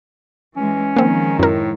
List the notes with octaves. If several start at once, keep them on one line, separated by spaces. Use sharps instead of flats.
E3 G#3 C#4
D#3 F3 G#3 A#3 C4
F#2 A2 A#4